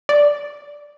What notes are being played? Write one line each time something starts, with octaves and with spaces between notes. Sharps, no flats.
D5